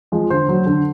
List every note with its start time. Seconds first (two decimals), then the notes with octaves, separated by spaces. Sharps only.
0.12 F3 G#3
0.30 D3 C5
0.49 F#3
0.66 D3